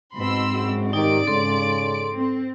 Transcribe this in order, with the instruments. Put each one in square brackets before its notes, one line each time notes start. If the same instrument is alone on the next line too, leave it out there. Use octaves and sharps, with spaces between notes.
[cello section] G#2 C4 [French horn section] B2 [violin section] B5 C6 E6
[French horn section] F#2 G#3 F#4
[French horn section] D#3 G4 [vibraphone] D#4 [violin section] D5 D7
[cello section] G#2 [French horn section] C#3 [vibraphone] A4 C6
[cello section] C4